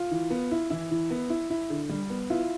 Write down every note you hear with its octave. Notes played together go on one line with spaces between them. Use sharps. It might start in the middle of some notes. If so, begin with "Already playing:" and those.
Already playing: F4
E3
B3
E4
E3 E4
E3
B3
E4
E4
D3
G3
B3
E4 F4